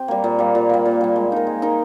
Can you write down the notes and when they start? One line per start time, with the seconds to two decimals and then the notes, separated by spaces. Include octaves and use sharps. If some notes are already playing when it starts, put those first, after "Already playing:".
Already playing: C4 G4
0.08 G3 A#3
0.24 A#2
0.39 G3 A#3
0.55 A#2
0.69 G3 A#3
0.85 A#2
1.01 G3 A#3
1.16 G#3
1.32 D#4 A#4
1.47 G#3
1.62 D#4 A#4